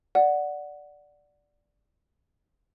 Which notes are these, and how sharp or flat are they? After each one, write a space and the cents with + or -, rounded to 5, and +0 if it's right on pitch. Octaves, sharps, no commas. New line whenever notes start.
D5 +0 F#5 +0